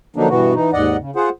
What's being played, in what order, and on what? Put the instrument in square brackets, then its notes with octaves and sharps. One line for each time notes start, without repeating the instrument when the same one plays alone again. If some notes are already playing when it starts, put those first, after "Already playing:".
[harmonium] D3 F3 F#3 A#3 D4 D#4
G2 B2 E3 B3 F#4
E3 D#4
D#2 G#2 D5 D#5 F#5
C#3
F4 G#4 C5 F#5